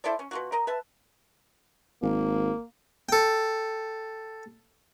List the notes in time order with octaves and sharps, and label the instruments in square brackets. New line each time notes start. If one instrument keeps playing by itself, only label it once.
[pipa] E4 A4 C5 D5
C#4
B2 F4 F#4
A#4 D#5 A#5
B4 E5 A5
[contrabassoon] G#1 [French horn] A#3
[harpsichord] A4 G5